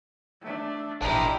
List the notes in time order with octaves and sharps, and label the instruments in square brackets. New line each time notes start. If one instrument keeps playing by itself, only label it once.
[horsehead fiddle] A3 D4
[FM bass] A1 [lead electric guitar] D4 A#4 [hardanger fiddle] E4 [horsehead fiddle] G4 D#5